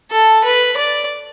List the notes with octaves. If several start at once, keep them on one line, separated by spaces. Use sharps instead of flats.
A4
B4
D5